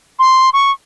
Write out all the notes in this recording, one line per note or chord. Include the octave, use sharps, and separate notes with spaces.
C6
C#6